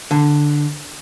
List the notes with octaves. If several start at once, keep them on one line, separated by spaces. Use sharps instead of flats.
D3